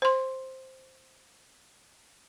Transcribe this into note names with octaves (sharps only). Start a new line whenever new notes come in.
C5 C6